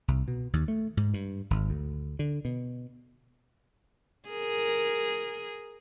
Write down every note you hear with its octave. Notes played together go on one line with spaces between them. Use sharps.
C2
B2
D#2
A3
G#2
G2
G#1
D2
D3
B2
G#4 A#4